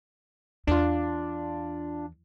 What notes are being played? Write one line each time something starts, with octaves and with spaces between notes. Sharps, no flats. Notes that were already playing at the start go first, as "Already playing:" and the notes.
E2 D4 F4